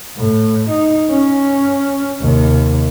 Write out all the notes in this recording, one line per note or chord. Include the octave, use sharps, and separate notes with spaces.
A2
D#4
C#4
D#2 C3